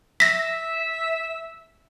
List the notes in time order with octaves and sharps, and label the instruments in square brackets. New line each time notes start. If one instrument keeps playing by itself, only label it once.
[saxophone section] E5 [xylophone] A#6 B6